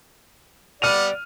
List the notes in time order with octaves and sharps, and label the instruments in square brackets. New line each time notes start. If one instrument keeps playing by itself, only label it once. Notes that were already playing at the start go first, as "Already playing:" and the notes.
[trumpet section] G3 B3 F#5 [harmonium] D5 [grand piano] F6 D#7 F7